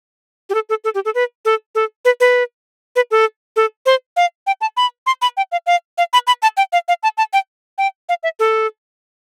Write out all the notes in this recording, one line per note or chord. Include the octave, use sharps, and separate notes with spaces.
G4
A4
A4
A4
G4
A4
B4
A4
A4
B4
B4
B4
A4
A4
C5
F5
G5
A5
B5
C6
B5
G5
F5
F5
F5
B5
B5
A5
G5
F5
F5
A5
A5
G5
G5
F5
E5
A4